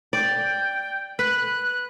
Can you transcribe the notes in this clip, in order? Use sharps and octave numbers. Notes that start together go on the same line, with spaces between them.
D5 G5
B4 F#6